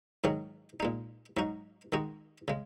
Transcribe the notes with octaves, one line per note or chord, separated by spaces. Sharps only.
G#2 D#3 F#3 C#4 G#4
A#2 G#3 D#4
G#2 F#3 D#4 F#4
D#3 G#3 D#4 F#4
C#3 G#3